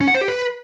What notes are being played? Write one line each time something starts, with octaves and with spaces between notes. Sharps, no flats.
C#4
F#5
C5
G4
B4